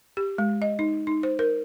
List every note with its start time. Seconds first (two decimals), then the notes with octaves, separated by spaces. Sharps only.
0.17 G4
0.38 G#3
0.62 D#5
0.79 D#4
1.07 D#4
1.23 C5
1.39 A#4